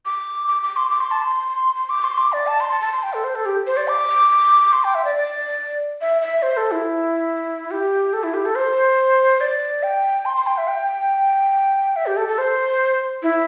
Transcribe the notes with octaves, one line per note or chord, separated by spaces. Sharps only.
D6
D6
D6
C6
D6
C6
A5
C6
C6
D6
C6
D6
D5
A5
C6
A5
A5
C6
G5
A4
C5
A4
G4
C5
D5
D6
C6
G5
E5
D5
D5
E5
E5
C5
A4
E4
G4
A4
E4
G4
A4
C5
D5
G5
C6
C6
G5
E5
G5
E5
G4
A4
A4
C5
E4